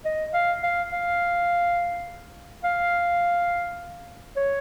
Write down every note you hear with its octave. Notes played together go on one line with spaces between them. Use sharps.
D#5
F5
F5
F5
F5
C#5